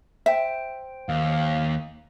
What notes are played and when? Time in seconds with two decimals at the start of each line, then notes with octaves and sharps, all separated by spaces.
0.26 C5 E5 G5
1.09 D#2 F5